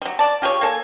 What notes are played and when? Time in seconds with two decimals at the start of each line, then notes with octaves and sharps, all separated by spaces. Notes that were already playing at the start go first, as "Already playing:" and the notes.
0.02 F#3 G3
0.19 D5 A5
0.42 F4 G4 G#4 C#5
0.61 A#3 A4 G#5